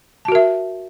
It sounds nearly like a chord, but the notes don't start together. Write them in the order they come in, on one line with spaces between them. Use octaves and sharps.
A5 F#4 A#4 E5